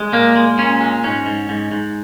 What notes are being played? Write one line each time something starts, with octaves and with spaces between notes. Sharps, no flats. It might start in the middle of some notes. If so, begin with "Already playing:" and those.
Already playing: G#3
A#2 A#3
G#3
A#2 C#4
G#3
G#2 C#4
G#2
G#2
G#2